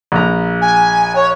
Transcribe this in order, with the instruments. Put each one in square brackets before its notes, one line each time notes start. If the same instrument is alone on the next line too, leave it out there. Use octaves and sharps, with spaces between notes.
[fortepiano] A#1 A#5
[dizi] G#5
C#5